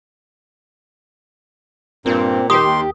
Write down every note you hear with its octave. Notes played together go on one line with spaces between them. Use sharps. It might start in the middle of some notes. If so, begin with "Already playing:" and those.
G2 A#2 C4
D#3 G4 A#4 C6 D#6
D#2